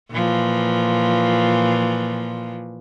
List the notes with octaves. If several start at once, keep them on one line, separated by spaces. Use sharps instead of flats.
A#2 E3 F3